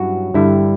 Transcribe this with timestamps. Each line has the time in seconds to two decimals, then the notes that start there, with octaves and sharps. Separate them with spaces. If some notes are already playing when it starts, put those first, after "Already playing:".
Already playing: G2 F#3 C#4 E4 F#4
0.34 G2 D3 G3 E4